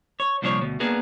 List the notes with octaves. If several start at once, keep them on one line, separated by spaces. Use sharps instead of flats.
C#5
C2 A#2 F3 D4 A4 C#5
D2 B2
A#3 B3 D4 G#4 A#4